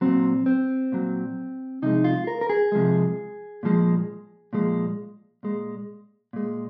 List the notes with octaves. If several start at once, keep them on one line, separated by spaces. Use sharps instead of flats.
A#2 F#3 C4
C4
A#2 F#3
C3 F3 G#3 D#4
F4
A#4
A#4
G#4
C3 F3 G#3
A#2 F3 G#3
A#2 F3 G#3
A#2 G#3
A#2 G#3